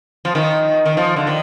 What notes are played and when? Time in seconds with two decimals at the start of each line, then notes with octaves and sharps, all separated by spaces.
0.25 F3
0.35 D#3
0.86 D#3
0.97 F3
1.16 D3
1.27 D#3